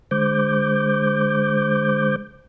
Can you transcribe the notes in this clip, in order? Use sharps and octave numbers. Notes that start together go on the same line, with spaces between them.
D3 G#3 C5 D6 G6